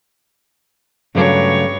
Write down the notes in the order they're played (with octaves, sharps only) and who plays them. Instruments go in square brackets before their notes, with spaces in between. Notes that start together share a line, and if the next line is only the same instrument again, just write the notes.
[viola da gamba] G2 C#5 [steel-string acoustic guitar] C#3 F#3 A3